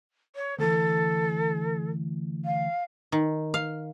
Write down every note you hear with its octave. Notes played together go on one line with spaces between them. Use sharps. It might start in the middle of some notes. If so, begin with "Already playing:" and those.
C#5
D2 E3 A4
F5
D#3
F5